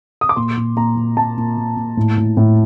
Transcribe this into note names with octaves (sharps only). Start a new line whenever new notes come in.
D#6
D6
A#2 C6
A#2
A#2 A#5
A#2
A#2 A5
A#2
A#2
A#2
A2
A2
A2